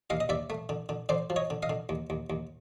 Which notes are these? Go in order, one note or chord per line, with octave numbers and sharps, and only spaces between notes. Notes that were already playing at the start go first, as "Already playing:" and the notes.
D#2 D#5 F5
D#5
D#2 D5 E5
A3
D3
D3
D3 C5 D5
F3
C#5 D#5
D3
D#5 F5
D3
D#2
D#2
D#2